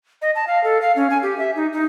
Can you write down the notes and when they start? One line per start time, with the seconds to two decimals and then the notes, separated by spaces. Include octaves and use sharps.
0.22 D#5
0.35 A5
0.47 F5
0.64 A4
0.82 F5
0.96 C#4
1.10 G#5
1.23 G4
1.39 E5
1.56 D#4
1.73 D#4